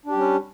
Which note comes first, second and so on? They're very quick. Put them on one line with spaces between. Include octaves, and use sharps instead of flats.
D4 G4 G3 C#4